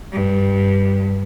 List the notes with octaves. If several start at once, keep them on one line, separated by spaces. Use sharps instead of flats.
G2